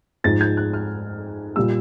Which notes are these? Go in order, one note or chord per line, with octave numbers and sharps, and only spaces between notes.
G#2 F3 G#3 A6
G#6
F#6
F6
A#2 G3 E6